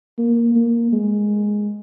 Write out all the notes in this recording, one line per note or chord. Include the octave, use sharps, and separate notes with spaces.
A#3
A#3
G#3